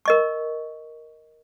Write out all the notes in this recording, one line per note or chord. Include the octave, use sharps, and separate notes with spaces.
A#4 D#5 C#6